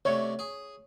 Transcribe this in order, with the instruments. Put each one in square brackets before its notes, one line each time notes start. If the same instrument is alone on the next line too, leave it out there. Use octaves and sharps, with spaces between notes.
[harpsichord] C3 A3 D4 [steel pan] C#5
[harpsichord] G#4